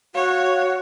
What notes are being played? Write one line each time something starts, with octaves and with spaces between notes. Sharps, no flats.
F#4 C#5 F5